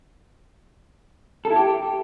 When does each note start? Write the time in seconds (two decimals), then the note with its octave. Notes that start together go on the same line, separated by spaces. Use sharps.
1.45 A4
1.50 E4
1.56 G4